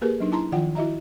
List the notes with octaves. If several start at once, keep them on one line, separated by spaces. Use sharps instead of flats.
A#3 G4 G#4 A#4 B4
F#3 D4 D#4
E4 A5 A#5 C6
D#3 F3 F4 F#5 G5
E4 F#4 D#5 E5 A#5